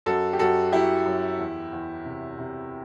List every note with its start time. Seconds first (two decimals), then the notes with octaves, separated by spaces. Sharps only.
0.06 F#2 F#4 A4
0.33 G4
0.39 F#2 F#4 A4
0.72 F#3 E4 G4
1.06 F#2
1.39 E2
1.73 E2
2.05 C3
2.39 C3